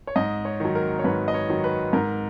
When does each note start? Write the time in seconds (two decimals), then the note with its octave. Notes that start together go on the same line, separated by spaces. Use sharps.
0.07 C#5
0.16 G#2 D#5
0.45 C#5
0.60 D#3 F#3
0.75 A#4
0.99 C#5
1.04 G#2 B4
1.28 D#5
1.34 C#5
1.49 D#3 F#3
1.64 B4
1.93 G#2 A#4